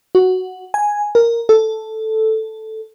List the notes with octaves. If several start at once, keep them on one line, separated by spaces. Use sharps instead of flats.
F#4
G#5
A#4
A4